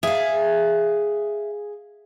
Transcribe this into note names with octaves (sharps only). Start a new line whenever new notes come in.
G#4 E5 F5